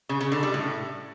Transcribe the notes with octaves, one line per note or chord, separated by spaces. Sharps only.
C#3
C#3
D3
G3
A2